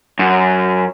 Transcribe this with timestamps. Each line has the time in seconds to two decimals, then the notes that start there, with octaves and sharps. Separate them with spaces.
0.19 F#2